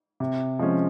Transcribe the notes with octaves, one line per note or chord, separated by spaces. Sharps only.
C3
F3 G#3 C#4